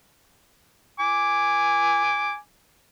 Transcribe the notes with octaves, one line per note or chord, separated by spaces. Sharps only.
G#5 D6